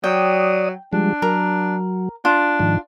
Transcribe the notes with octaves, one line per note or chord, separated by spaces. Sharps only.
F#3 D5 G5 D#6
F3 G3 G#3 D4
F#3 A#4
D4 F4
G#2 D#3 F3